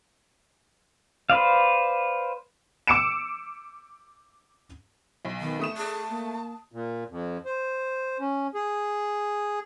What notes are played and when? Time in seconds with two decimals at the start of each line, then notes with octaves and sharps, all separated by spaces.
1.30 B4 C5 D5 F5
2.87 D6 E6 C#7 D7 E7
5.25 B1
5.41 D#3 B3
5.59 A3 D#6 E7
5.77 G#4 A5
6.09 A#3
6.72 A#2
7.10 F2
7.45 C5
8.20 C#4
8.55 G#4